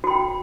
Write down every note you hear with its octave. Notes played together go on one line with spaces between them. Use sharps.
F#4 G5 B5